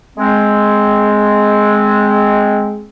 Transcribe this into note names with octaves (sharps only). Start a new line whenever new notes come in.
G#3 C4